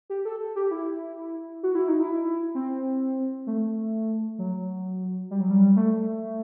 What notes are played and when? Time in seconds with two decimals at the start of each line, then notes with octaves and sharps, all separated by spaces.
0.10 G4
0.25 A4
0.55 G4
0.71 E4
1.63 F#4
1.75 E4
1.88 D#4
2.00 E4
2.55 C4
3.47 A3
4.39 F#3
5.31 G3
5.40 F#3
5.50 G3
5.76 A3